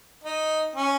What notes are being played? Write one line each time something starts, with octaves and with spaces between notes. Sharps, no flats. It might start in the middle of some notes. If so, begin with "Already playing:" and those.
D#4
C#4